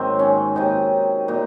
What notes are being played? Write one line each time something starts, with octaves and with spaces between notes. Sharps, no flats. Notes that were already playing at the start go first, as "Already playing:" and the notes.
Already playing: G#2 D#3 F#3 C4
C#4
C3 D#3 F#3 D#4
A#2 F#3 D#4